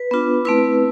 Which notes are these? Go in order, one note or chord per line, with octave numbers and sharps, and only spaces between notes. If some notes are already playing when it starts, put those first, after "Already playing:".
Already playing: B4
B3 D4 F4
A3 C4 E4 B4